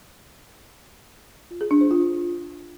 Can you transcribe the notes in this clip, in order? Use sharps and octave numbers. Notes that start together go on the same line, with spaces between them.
F4
G#4
D4
C5
F4